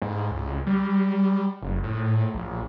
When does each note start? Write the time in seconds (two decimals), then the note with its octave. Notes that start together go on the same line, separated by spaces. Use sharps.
0.02 G#2
0.31 C#2
0.67 G3
1.62 F#1
1.83 A2
2.34 A#1